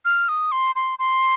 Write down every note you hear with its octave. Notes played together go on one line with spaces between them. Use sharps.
F6
D#6
C6
C6
C6